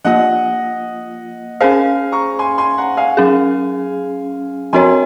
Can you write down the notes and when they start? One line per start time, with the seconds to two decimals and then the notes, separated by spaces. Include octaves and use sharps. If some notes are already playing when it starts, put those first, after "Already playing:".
0.05 F3 A#3 F4 D#5 F#5
1.60 C#4 G#4 C5 F5 G#5
2.12 A#5 C#6
2.39 G#5 C6
2.58 G#5 C6
2.78 F#5 A#5
2.97 F5 G#5
3.17 F#3 C#4 G#4
4.73 F3 C4 F#4 A#4 C#5 G#5 C6